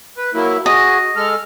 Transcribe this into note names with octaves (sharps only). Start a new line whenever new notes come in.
B4
F#3 A#3 E4
F#4 G#4 D#5
G#3 A4 F6